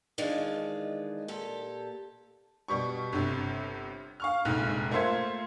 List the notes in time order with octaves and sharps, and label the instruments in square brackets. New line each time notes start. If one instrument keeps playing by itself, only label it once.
[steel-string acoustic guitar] D#3 E3 G#3 D4 F4
A#2 G4 A4
[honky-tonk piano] B2 G3 C#6
G1 G2 C3
F5 C#6 F6
F1 A#1 G#2 F6 F#6
A3 A#3 F4 C5 E5 G#6